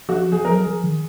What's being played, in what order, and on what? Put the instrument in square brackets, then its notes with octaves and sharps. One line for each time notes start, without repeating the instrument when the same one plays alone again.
[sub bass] F3 [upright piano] F#4
[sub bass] F3 [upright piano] G#4
[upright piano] A#4
[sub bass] F#3
[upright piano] G#4
[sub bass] F3
D#3